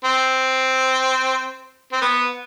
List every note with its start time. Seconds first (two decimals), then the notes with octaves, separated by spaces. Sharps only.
0.05 C4
1.92 C4
2.01 B3